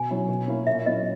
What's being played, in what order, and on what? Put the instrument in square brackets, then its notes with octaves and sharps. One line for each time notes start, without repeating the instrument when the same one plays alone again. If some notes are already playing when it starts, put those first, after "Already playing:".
Already playing: [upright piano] B2 [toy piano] G#5
[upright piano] F#3 C#4 E4
B2
A#3 C#4 E4
[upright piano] A#2 [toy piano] E5
[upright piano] F#3 C#4 E4 [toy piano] D#5